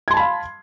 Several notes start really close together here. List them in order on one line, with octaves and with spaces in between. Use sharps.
G#6 C6 A5 B5 F5